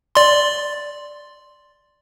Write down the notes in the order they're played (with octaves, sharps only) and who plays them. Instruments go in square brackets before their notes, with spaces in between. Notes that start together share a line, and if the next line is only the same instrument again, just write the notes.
[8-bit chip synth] D5 C6